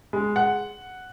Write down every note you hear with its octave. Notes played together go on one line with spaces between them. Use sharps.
G#3
F#5